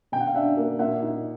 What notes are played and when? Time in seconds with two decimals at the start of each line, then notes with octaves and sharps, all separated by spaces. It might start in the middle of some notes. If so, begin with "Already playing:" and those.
0.12 B2 G5
0.20 F#5
0.27 F5
0.35 D4 E5 F#5
0.57 A#3
0.79 A#2 E5 F#5
1.02 D#4